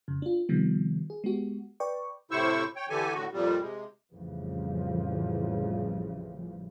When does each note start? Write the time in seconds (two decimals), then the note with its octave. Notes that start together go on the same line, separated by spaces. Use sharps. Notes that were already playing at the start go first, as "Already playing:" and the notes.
0.08 F2 C#3
0.22 D4 F4
0.49 C3 D#3 F3 G3 B3
1.10 G#4
1.24 G#3 B3 F#4 G4
1.80 B4 D5 G5 C#6
2.31 A2 C3 E4 C5 C#6 E6
2.76 C#5 G5
2.90 D3 E3 G4 A4 G#5
3.14 A2 D3 F#4
3.32 F2 A#2 G3
3.61 C3 G#3
4.13 A1 F2 C#3 E3 F3 G3